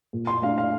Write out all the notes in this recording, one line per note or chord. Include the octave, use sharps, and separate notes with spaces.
A#2
C6
A3 D4 F5
F5